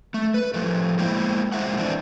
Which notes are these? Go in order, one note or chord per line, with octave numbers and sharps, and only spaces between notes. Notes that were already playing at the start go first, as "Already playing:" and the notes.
A3
B4
A2 F3 A3
G#3 A#3 E4 C5 G5
F2 A#2 G#3 C5 E5 F#5
E3 C4 D4